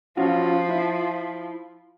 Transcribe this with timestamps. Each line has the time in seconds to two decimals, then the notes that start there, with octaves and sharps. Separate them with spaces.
0.17 F3 C#4 F4 F#4
0.69 E4